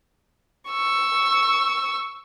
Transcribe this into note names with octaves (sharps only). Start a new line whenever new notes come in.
C#6 E6